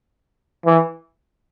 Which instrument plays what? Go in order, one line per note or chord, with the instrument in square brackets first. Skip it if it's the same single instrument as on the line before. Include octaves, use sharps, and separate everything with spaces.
[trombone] E3